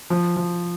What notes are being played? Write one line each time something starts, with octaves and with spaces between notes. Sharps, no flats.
F3
F3